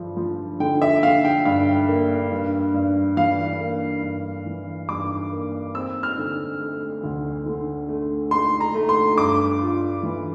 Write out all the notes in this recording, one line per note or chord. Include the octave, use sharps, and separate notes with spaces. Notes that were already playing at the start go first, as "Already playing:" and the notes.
Already playing: G2 D3 F3
F3
D3 G5
E5
D3 F5
G5
G2 F5
A#3
G2
G2
E3 F5
A#3
G2
E3
G2 D6
A#3
C4 E6
F6
D3
A3
D2
D3
A3
A3 C6
A#5
A3
C6
G2 D6
F4
E3